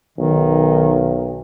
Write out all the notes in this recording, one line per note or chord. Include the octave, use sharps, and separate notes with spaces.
B1 D#3